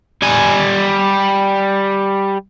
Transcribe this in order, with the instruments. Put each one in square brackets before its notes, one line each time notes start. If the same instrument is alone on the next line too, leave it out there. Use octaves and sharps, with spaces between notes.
[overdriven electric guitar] G3 G#5